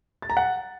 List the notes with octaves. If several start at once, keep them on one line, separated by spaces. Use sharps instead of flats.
A6
A#5
F#5